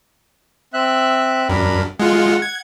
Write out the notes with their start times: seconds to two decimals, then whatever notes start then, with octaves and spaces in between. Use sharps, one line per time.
0.74 C4 E5 F#6
1.49 F#2 D4 A#4 B5
2.00 G#3 F4 F#5
2.42 G#6